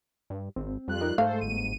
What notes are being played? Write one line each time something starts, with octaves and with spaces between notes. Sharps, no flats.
G2
G#1 C4
F2 G3 F4 F#6
D#4 A#4 D#5
G#2 A3 A4 C5 F5
G1 D#7